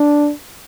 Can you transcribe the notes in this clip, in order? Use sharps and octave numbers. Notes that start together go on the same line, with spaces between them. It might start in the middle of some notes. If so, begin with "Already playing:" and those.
Already playing: D4